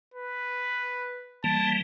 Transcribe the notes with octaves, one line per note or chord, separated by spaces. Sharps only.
B4
E3 G3 A#3 A5